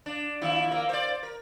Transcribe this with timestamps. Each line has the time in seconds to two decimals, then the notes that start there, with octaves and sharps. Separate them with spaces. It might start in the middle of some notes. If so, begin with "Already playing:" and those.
0.06 D4
0.42 D#2 F3 E4
0.71 A#3 A#4
0.89 C5 D5
1.23 A#4